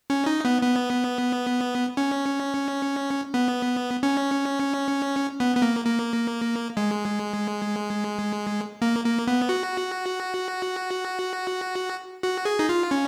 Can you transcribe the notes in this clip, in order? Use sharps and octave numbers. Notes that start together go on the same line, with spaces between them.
C#4
D#4
B3
B3
C#4
B3
C#4
B3
B3
A#3
A#3
G#3
A#3
A#3
B3
F#4
F#4
G#4
D#4
F4
C#4